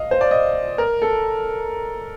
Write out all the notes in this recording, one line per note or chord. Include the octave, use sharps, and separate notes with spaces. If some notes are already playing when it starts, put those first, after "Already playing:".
Already playing: D#5 F5
C5
D5
D#5
A#4
A4